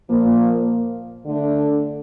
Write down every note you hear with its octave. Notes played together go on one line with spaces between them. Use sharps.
A#2 F3 A#3
D3 A3 D4